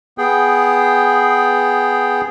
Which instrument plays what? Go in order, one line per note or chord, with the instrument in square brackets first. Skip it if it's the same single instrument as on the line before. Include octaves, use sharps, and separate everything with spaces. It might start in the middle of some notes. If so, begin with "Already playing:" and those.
[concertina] B3 G#4 G5